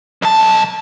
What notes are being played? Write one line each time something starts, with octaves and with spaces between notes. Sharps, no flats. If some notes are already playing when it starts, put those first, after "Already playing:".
B1 A5